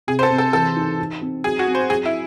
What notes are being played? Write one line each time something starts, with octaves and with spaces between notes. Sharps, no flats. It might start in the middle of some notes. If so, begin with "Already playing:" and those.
C3 G#4
C5
A4
C3
A4
E3 A4
D#4
D#4
C4
F#3 G#4
F#4
C4
C5
F#3 G#4
E4